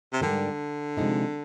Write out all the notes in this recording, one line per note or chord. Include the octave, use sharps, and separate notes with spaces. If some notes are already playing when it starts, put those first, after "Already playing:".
C3
G#2 D3 G3 D4 G4 A#4
C3 F3 G#3 D#4